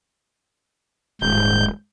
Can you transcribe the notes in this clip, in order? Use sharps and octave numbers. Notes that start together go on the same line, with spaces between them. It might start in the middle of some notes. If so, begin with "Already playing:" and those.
D#1 G#2 G6